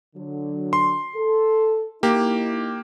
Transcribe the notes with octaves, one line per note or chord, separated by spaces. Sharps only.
D3 F#3
C6
A4
A#3 D#4 E4 G4